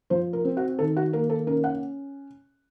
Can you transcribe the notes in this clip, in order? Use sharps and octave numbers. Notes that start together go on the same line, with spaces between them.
F3 C5
A#4
C4
F#4
D#3 A4
F#4
A#3 A#4
A4
C#4 A#4
F#5